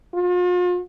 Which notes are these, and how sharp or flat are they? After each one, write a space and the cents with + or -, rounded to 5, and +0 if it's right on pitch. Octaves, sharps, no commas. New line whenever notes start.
F4 +40